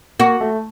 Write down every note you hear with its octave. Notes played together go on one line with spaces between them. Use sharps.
A#3 F#4
A3